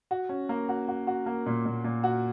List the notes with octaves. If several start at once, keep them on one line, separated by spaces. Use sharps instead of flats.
F#4
C#4
A#3
F#4
F#4
F#4
A#3
A#2
A#2
A#2
F#4